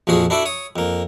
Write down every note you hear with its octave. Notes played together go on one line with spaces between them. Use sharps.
A#1 F2 F3 F#4 G#4
D4 E4 F#4 A4 D5 E5
C#5 D#6
F2 A#3